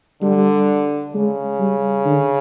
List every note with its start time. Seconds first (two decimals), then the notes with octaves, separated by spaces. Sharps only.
0.22 D3 G3
1.14 C#3 G#3
1.59 G3
2.05 D3